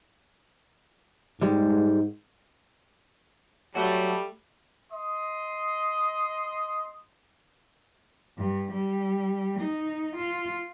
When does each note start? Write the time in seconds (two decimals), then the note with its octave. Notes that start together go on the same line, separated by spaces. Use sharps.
1.42 G#2 G3 G#3
3.75 F#3 G3 A3 F#4
4.92 D#5 C6 D#6
8.37 G2
8.72 G3
9.59 D#4
10.16 F4